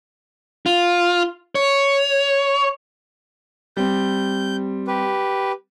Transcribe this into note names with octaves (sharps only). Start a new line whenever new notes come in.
F4
C#5
G3 C4 G6
G4 B4